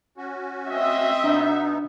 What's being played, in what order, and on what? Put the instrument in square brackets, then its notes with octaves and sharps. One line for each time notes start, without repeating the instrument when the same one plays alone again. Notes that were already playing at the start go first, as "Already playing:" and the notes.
[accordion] C#4 F#4
[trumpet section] C4 D#5 [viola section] E5
[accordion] B2 B3 D#4 [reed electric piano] D4